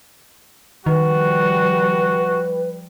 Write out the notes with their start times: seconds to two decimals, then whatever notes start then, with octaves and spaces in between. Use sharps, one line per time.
0.86 D#3 F3 G3 F#4 B4